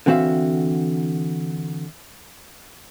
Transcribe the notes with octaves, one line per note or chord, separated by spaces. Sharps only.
D3 E3 C4 F#4 E5 F5